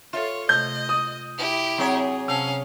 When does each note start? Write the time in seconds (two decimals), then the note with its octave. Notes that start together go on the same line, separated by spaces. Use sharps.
0.13 F4 A4 C#5 E5
0.49 C3 A3 D#5 G6
0.89 D#6
1.38 E4 G4
1.78 F#3 C4 G#4 C#5
2.28 C3 C#4 F5 A5 E6